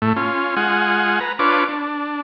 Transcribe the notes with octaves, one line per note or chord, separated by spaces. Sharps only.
A2 A3
C#4 F4
G#3 F4 F#5 G#5
B4 A#5
D4 F4 B4 C#5 D6
D4